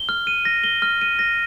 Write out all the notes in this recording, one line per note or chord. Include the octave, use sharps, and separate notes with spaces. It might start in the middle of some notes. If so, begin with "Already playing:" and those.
Already playing: G7
F6
D#7
A#6
G7
F6
D#7
A#6